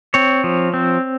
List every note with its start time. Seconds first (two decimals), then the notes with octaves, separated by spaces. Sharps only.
0.14 C4 C#5
0.44 F3
0.74 C4